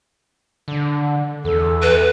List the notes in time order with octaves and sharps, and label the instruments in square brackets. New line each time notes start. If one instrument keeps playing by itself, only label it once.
[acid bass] D3
[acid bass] E2 [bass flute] A4
[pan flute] B4